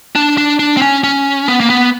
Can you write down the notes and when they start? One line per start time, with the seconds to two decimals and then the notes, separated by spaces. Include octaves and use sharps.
0.15 D4
0.38 D4
0.59 D4
0.77 C4
0.82 C#4
1.04 C#4
1.48 B3
1.60 A#3
1.70 B3